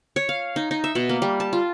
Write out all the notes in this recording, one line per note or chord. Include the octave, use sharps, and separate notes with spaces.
C#5
F5
D#4
D#4
E5
B2
A#3
G3
A5
F4